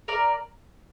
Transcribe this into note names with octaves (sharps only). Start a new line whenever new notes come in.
A#4 D5